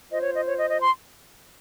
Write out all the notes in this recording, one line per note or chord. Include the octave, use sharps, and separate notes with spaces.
F4 C5 D#5
C#5
D#5
C#5
D#5
D#5
C6